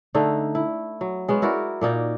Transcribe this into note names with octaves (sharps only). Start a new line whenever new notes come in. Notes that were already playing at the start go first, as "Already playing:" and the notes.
D3 A3 D#4
E4
F#3
G#3 B3 C#4
E4 F#4 A#4 D5
A#2 A#3 D#4 D5